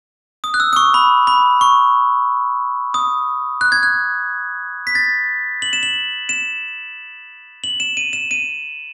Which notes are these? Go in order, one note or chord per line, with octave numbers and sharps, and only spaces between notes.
D#6
F#6
E6
D#6
C#6
B5
B5
C#6
D#6
F#6
G#6
F#6
B6
A6
F#7
E7
F#7
E7
F#7
E7
D#7
E7
D#7